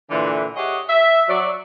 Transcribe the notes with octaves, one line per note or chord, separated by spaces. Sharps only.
A#2 D3 E3
G4 G#4 C#5 D#5 E5 F#5
E5
F#3 D5